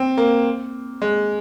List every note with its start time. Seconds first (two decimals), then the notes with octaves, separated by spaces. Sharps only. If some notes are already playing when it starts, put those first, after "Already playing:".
Already playing: C4
0.17 A#3
1.02 G#3